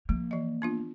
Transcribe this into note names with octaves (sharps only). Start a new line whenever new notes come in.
F3 A#3
E3 D#5
B3 D4 F4